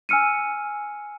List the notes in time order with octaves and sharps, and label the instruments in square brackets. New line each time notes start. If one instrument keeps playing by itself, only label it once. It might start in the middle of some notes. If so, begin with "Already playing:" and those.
[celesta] G#5 E6 F6 C#7 D#7